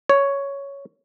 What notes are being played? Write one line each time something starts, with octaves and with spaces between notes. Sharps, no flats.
C#5